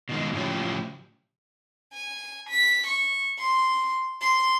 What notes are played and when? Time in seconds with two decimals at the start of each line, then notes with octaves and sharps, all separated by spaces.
0.09 B2 D#3 G#3
0.33 A2 C#3 F3 F#3 G4
1.93 G#5
2.49 B6
2.86 C#6
3.39 C6
4.21 C6